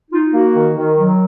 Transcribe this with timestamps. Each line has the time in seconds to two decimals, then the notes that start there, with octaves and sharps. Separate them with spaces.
0.11 D#4 F4
0.32 A#3 F#4
0.54 D#3
0.77 D#3
0.98 F#3